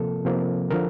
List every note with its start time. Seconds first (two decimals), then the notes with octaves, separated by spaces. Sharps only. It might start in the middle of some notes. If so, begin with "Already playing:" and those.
Already playing: C3 F3 A#3 A4
0.25 C3 F3 A#3
0.71 D3 F3 A#4